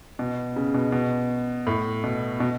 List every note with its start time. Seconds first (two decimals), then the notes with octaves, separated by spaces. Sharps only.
0.19 B2
0.56 C#3
0.74 B2
0.92 B2
1.67 A2
2.04 B2
2.40 B2